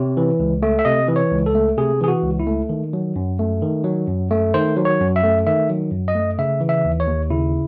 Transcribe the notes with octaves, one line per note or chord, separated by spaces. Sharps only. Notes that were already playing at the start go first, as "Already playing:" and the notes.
Already playing: C3 C#5
E3
C#2
A3
E5
C3 D#5
E3
C#5
C#2
A4
A3
C3 G#4
E3 G#4
F#4
C#2
E4
A3
D#3
F#3
F#2
A3
D#3
F#3
F#2
A3
D#3 C5
F#3
C#5
F#2
E5
A3
D#3 E5
F#3
F#2
D#5
A3
C#3 E5
E3
E5
D#2
C#5
D#2
C#3 E4